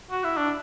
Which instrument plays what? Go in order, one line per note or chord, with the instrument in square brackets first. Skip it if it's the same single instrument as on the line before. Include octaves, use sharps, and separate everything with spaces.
[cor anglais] F#4
E4
D4